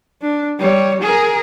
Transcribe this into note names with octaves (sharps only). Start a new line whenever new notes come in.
D4
G3 C#5
G#4 A#4